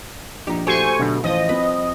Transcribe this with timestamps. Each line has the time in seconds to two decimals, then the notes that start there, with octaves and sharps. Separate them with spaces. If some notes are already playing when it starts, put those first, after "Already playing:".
0.47 A#1 D#4 G4
0.67 A3 F#4 G4 C5 G#5 C#6
0.99 B2 D3 F#3 D4
1.24 A1 F3 D#5
1.49 F3 C4 B4